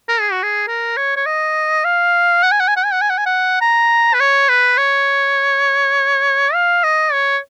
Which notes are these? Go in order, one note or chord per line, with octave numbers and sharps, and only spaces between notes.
A#4
G#4
F#4
G#4
A#4
C#5
C#5
D#5
F5
F#5
G#5
F#5
G#5
F#5
G#5
F#5
G#5
F#5
G#5
F#5
A#5
B4
C#5
B4
C#5
F5
D#5
C#5